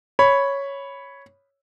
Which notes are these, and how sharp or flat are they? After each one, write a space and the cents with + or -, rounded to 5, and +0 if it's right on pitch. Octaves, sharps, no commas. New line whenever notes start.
C#5 +0 B5 +0